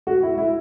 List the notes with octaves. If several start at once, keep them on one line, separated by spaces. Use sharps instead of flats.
F#4
E4
E4